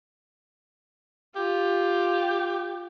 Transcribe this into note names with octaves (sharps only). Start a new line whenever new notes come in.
F4 G4